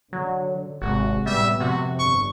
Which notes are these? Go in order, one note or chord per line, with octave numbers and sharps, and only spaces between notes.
D3 F#3
G#1 C3 G#3 F#4
A2 G3 G#3 B3 E5
F2 C3 F#4
G1 D3 C#6